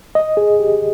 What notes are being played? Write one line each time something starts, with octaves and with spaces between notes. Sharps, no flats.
D#5
G#4
G4